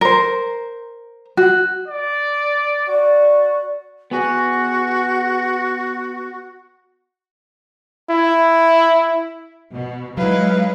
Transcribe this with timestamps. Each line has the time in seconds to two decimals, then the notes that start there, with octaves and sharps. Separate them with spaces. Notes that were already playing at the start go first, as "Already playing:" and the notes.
0.01 A#4 C5
1.37 F#4
1.88 D5
2.88 F#4 D5
4.11 B3 F#4 G#4
8.10 E4
9.72 B2
10.17 F#3 G#3 D#4 E4 B4 F5